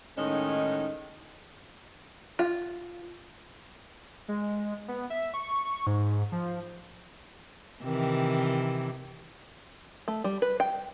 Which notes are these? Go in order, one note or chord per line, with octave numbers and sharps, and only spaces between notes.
A2 D#3 G#3 C#4 D#4
F4
G#3
B3
E5
C#6
G#2
F3
C3 D#3 E3
A3
G3
B4
G5